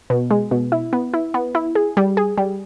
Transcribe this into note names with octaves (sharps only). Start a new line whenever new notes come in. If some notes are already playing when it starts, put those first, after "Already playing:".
B2
G#3
B2
E4
B3
E4
B3
E4
G#4
G3
G#4
G3